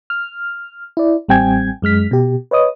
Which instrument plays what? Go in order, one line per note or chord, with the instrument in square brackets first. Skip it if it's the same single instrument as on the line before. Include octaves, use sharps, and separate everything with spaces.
[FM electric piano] F6
E4 D5
A1 G3 C4 G5 G#5 G#6
F#2 G#3 F6 B6
B2 G4
B4 C#5 D#5 D#6